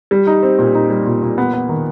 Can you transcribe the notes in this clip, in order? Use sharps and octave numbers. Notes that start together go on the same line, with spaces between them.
G3
D#4
C4
A#2
D#4
G3
A#2
A#2
B3
B3
D#3